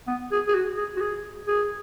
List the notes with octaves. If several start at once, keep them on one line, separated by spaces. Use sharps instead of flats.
B3
G#4
G#4
F#4
G#4
F#4
G#4
G#4